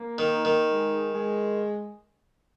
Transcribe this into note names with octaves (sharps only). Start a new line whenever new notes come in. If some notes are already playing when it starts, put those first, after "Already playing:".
Already playing: A#3
D#3
D#4
D#3
G#3
G#3